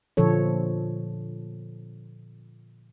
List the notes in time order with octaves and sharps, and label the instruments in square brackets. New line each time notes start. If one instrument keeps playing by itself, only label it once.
[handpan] A#2 D3 F3 A4 C#5